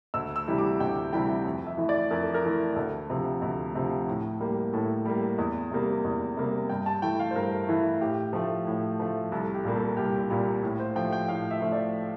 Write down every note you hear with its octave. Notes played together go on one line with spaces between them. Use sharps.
D2 E6
E6
C3 E3 G3
D6
D2 G5
C3 E3 G3 G5
F2
E5
E3 A3
D5
F2 A#4
A4
A#4
E3 A3
D2 A4
C3 F3
D2
C3 F3
A2
G3 A#3
A2 A4
G3 A#3
E2
C3 G3 A#3
E2
C3 G3 A#3
G2 G5
A5
E3 A3 G5
F5
C5
G2 A#4
E3 A3
A2 G4
F3 A3
A2
F3 A3
C2 A4
G4
A#2 G3 A#3
A4
C2 G4
A#2 G3 A#3
A2
C5
F3 A3 G5
G5
A2 F5
E5
F3 A3
D5